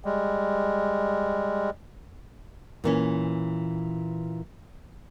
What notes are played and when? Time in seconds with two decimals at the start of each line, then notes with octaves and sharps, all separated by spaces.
0.05 G3 G#3
2.84 A#2 E3 C#4